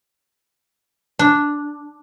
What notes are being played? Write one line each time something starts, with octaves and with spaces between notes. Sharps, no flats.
D4